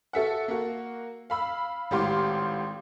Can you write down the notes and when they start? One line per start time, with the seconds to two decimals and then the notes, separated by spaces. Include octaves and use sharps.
0.13 F#4 A4 E5 F#5
0.48 A#3 F#4
1.30 F5 B5 E6
1.91 G#1 A2 G4 F5 C6 D6